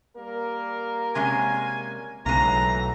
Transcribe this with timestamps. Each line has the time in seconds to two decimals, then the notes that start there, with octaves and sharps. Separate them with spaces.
0.17 G3 A#3 A#4
1.15 C3 G#3 C#4 G#5
2.26 B1 C#3 E3 F#3 G#3 A3 A#5